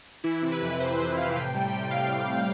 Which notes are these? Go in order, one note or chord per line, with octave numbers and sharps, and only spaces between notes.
E3 E4
C3
B4
F2
F2 C5
E3
C3 F5
A2 G5
G3
G5
G3
A2 F5
A2
G3